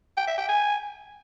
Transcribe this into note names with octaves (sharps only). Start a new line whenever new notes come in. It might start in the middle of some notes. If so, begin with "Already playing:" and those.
G5
E5
G5
G#5